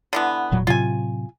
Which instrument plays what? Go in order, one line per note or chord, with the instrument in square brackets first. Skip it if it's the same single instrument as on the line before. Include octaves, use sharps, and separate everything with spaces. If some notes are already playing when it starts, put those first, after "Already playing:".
[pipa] D3 E3 B3
[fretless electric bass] E1 A#2 F#3
[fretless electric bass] A2 C3 F#3 [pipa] F4 G#5